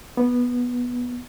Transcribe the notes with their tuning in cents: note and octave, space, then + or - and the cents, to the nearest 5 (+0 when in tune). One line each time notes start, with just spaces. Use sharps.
B3 -10